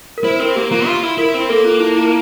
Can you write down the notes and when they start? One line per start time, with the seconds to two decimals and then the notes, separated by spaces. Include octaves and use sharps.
0.18 A#4
0.24 E4 C5
0.40 C4 A#4
0.56 A#3 G4
0.71 A#3 F4
0.86 F4
1.03 E4
1.18 E4 A#4
1.34 C4
1.49 A#3 A4
1.65 F4
1.80 E4
1.96 E4